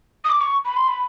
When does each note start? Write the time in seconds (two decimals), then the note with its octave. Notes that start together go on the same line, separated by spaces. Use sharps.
0.24 D#6
0.29 D6
0.41 C#6
0.65 B5
0.76 C6
0.88 B5